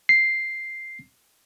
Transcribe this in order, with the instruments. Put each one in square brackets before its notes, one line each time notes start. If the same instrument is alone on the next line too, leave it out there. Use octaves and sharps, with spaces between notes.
[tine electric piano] C7